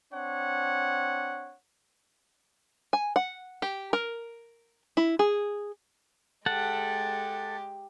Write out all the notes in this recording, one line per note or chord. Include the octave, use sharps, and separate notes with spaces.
C4 D4 C#5 F#5
G#5
F#5
G4
A#4
E4
G#4
G#3 G4 A4 F#5